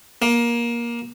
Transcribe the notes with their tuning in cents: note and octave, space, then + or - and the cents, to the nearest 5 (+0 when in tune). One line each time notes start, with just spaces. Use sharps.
A#3 +20